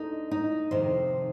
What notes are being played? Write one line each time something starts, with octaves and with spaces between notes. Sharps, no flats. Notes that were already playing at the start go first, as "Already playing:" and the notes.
Already playing: D2 D3 D#4
D#4
F2 C3 D#3 C5